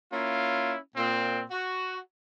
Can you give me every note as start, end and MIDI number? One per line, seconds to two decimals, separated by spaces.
0.13 0.76 58
0.13 0.76 61
0.13 0.76 64
0.13 0.76 65
0.97 1.42 46
0.97 1.42 60
1.51 2.00 66